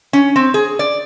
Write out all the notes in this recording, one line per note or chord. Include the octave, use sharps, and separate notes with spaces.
C#4
C4
G#4
D5